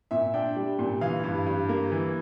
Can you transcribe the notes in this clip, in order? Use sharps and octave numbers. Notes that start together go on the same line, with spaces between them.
A#2 E5
D4 G5
G3
A#2
E3 F5
G2
G2
A#3
E3